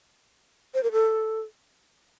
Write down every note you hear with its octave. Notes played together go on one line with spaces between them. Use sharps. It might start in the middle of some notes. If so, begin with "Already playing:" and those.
C5
A#4
A4